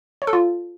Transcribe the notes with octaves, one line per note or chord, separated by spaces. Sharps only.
C#5
A4
F4